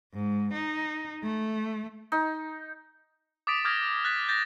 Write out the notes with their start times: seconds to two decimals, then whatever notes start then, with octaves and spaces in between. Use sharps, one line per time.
0.14 G#2
0.54 D#4
1.23 A3
2.12 D#4
3.47 D6 D#6 A6 B6 D7
3.65 D6 D#6 F6 G6 G#6 A#6
4.05 F#6 A6 B6
4.29 G6 A6 A#6